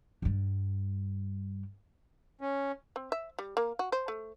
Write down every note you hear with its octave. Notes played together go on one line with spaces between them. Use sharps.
G2 G3
C#4
C4
E5
G3
A#3
F#4
C5
A3